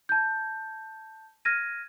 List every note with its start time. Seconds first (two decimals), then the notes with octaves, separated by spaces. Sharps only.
0.09 A5 G6
1.45 F6 G#6 A#6 D#7